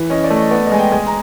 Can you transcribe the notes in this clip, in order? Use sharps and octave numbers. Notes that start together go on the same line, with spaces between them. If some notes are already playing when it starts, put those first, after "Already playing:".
Already playing: E3
C#4 D#5
D5
A3
D#5
B3 D5
D#5
G#3 G#5
G5
G#3 G#5
A#5